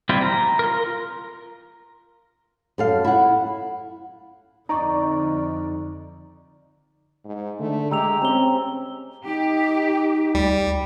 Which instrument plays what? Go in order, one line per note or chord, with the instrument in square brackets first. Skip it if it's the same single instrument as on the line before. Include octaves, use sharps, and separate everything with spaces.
[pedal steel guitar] G3 C4 E4 F4
A#5
F4 A#4
[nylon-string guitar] F#2 A4 F5
E4 F#5
[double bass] F2 D3 [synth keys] D#4 D5 [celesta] A#5 C#6
[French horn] G#2
[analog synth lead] D3 [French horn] A3
[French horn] G#3 [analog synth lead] G4 [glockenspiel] A#5 E6 F7
[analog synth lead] C4 [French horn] C#4 [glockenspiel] A#5 G7
[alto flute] D#4 [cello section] G4
[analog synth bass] D2 [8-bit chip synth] G3